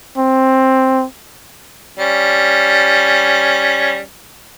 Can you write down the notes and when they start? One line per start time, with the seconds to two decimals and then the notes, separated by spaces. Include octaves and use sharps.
0.18 C4
1.99 G3 C#4